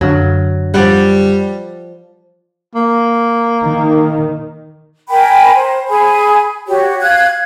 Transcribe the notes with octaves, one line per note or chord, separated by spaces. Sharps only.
F#2 D3 F#3
F3 G3 D5 F#5
A#3
D#3
A#4 G5 G#5 B5
C5
G#4 G#5 B5
F#4 G4 C#5
F5 F#6 G#6